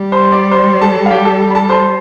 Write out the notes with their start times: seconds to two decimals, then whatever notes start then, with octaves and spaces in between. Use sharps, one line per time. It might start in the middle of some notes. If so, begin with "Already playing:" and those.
Already playing: G3
0.12 C5 C6
0.32 D5 D6
0.51 C5 C6
0.81 A4 A5
1.06 F5
1.10 G4 G5
1.25 A4 A5
1.50 B5
1.55 A4 A5
1.69 C5 C6